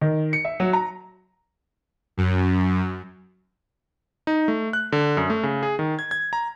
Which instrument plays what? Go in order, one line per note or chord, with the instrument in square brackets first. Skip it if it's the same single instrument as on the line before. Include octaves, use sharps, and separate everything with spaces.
[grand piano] D#3
C#7
E5
F#3
A#5
[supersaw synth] F#2
[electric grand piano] D#4
A3
F#6
D3
F#2
A3
C#3
G#4
D#3
G#6
G#6
A#5